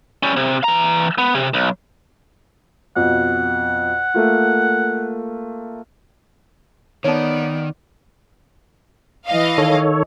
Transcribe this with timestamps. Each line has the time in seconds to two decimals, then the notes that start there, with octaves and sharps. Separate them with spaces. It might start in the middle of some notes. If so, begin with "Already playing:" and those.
0.23 G3 C#4
0.37 C3
0.64 E3 A#5
1.18 B3
1.35 C3
1.54 B1
2.96 F2 B2 F#5
4.14 A3 A#3 F4
7.04 D#3 B3 C#5 D5 A5
9.27 E3 D#5 F5
9.58 D#3 A4 C#5